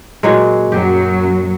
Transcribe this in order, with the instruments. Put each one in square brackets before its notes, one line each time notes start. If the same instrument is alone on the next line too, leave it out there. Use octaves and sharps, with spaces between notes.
[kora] A#2 F#3 G#3
[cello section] F#2 F#3 [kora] G4